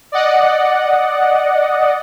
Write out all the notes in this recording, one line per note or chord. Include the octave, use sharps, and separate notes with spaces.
D5 D#5 F#5